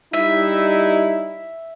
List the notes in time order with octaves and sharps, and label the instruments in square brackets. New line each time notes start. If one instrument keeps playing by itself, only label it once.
[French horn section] G3 D#4 E4 [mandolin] E5